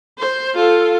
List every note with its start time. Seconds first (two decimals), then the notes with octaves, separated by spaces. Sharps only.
0.19 C5
0.55 F4 A4